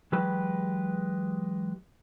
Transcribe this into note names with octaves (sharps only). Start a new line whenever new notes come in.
E3 F#3 G#3 G4 B4 B5